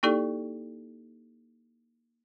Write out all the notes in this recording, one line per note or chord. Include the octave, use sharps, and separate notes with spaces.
A#3 D#4 E4 G4 A4 D5